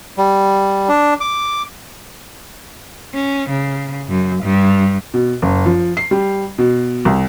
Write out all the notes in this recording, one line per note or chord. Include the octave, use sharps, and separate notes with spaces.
G3
D4
D6
C#4
C#3
F#2
G2
B2
F#1
F3
C7
G3
B2
C2